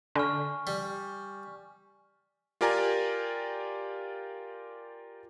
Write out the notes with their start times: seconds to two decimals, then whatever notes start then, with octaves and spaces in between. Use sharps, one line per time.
0.16 D3 G#5 C#6 F6
0.67 G3
2.61 F4 G4 A#4 D5 G#5 A#5